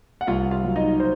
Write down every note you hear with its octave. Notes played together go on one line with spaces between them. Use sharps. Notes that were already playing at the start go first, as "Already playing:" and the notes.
F#5
C2 F4 F5
F4 F5
F#3
D#4 D#5
C5